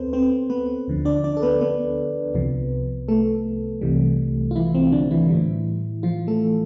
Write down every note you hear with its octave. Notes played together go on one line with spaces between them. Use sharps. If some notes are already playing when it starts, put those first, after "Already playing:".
Already playing: D2 B3 C4 A4 B4 C5
C4 C5
B3 B4
D2 D3 F3
D4 D5
D4 D5
A4
B3 B4
B3 B4
C2 C3 F3
A3 A4
C2 C3 E3 G3
F4
E3 E4
C4
D3 D4
E3 E4
A2 G3
F3 F4
A3 A4